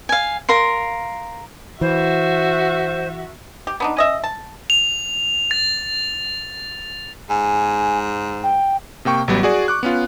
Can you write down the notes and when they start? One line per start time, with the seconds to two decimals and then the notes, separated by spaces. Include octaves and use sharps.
0.09 F5 G#5
0.49 A#4 F5 C6
1.81 E3 F#4 C5 E5
3.67 G4
3.80 B3 D4 D#4
3.97 C#4 D#5 E5
4.24 A5
4.70 F7
5.51 A6
7.30 G#2 G#5
8.43 G5
9.05 C3 A#3 G5 C#6
9.28 A1 F#3 G3 B3
9.43 F#4 G#4 D5
9.68 C#6 D6 F#6
9.83 B3 C#4 F4